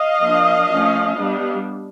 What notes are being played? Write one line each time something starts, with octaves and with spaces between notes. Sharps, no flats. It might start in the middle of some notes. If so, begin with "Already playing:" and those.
Already playing: D#5 F5
F3 A#3 D4
F3 A3 C#4
G3 B3 D4